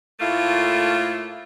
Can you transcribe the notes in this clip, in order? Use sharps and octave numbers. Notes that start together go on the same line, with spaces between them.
A2 A3 A#3 E4 F4